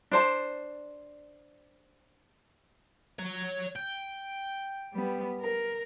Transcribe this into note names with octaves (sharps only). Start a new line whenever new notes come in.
D4 C5 A5
C#5 A#5
G5
G3 B3
A#4